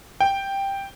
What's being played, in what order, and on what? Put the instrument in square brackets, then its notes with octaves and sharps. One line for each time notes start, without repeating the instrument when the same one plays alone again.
[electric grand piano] G5